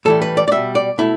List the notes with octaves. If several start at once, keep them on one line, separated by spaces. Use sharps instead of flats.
A2 E3 G3 A4
B4
D5
D5
B2 G3 E5
D5
B2 A3 E4